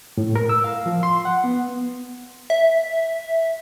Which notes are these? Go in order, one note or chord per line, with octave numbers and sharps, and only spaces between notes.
A2
A#4
E6
F5
F3
C6
F#5
B3
E5